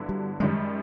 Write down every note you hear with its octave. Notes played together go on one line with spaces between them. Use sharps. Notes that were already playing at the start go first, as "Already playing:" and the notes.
Already playing: G2 D3 F#3 B3 E4
G3
F#2 D#3 G3 G#3